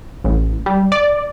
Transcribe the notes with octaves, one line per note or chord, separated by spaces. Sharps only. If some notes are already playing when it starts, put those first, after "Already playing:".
A1
G3
D5